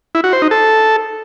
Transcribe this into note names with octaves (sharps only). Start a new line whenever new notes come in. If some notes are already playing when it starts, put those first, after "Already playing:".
E4
F#4
C5
D#4
A4